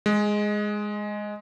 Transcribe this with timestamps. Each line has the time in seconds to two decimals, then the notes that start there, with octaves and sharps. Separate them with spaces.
0.06 G#3